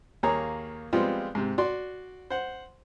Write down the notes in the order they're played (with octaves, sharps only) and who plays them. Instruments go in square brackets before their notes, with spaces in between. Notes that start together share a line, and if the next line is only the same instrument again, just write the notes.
[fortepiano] D#2 A#3 G#4 C#5 A#5
F3 G3 G#3 B3 C4 F4
G#2 C3
F#4 D5 C6
C5 F#5